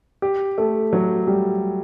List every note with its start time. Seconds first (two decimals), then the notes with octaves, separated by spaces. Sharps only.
0.22 G4
0.58 A3
0.93 F#3
1.27 G3